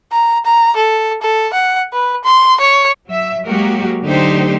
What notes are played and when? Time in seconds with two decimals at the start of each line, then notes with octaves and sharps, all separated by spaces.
0.12 A#5
0.45 A#5
0.76 A4
1.22 A4
1.54 F#5
1.93 B4
2.24 C6
2.60 C#5
3.07 F#3 E5
3.47 F#3 G#3 A#3 F#4 G4 A#4
4.04 D3 F#3 A3 D#4 G4 C5